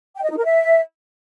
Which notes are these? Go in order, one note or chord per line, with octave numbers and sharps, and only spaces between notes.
G5
D#5
D#4
A#4
E5